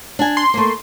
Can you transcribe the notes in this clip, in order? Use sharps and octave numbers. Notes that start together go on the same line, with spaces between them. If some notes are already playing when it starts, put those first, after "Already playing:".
D4 G#5
C6
A3 A#3